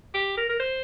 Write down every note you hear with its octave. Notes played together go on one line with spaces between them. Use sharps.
G4
A#4
A#4
C5